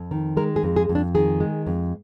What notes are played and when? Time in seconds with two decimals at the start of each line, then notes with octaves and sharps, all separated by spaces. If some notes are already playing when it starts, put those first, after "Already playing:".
Already playing: F2
0.11 D#3
0.37 G#3 A#4
0.56 G#4
0.63 F2
0.76 G#4
0.89 F2
0.95 D4
1.15 D#3 G#4
1.40 G#3
1.66 F2